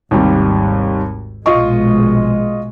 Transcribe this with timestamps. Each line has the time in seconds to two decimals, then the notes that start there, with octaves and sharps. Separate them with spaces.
0.11 G#1 D#2 C3 G3
1.46 A#1 B2 G#3 F4 D#5 C#6